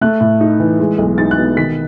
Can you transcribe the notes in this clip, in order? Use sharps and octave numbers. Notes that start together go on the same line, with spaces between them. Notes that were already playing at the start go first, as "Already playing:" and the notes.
A3 F#6
A2
D#4
E3
G#3
B1
D#4 A6
F#6
B2
D#3 B6